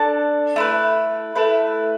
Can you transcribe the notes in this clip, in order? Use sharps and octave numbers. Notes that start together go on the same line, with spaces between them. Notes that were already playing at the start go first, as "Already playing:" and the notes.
Already playing: D4 A4 D5 A5
A3 E4 B4
A3 E4 B4